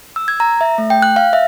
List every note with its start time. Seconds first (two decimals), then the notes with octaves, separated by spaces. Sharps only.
0.16 E6
0.28 G#6
0.40 A#5
0.61 E5
0.78 A3
0.90 G5
1.02 F#6
1.16 F5
1.33 E5